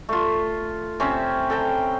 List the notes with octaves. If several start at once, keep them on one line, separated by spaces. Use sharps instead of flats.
A3 F4
C3 C#4 C5 E5
A4 G5 A#5